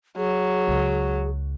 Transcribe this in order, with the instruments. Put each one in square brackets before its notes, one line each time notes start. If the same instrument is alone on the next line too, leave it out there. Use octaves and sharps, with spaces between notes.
[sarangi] F#3 [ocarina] G#4
[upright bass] C#2